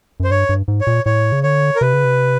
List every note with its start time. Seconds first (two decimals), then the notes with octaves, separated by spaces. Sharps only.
0.20 F#2 C5
0.31 G2 C#5
0.49 G2
0.68 G#2
0.81 C#5
0.87 A#2
1.06 A2 C#5
1.32 C#3
1.43 D3 C#5
1.76 A#4
1.81 C3 B4
1.94 C#3
2.05 C3